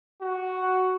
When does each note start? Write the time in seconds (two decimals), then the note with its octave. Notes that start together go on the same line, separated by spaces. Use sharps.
0.21 F#4